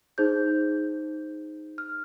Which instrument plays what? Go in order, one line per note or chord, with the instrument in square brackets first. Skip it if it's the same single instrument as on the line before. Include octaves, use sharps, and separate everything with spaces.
[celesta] D#4 G#4 C5 G6
F6